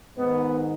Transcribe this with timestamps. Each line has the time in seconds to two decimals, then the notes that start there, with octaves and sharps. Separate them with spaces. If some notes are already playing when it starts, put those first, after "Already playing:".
0.16 G#2 D#3 B3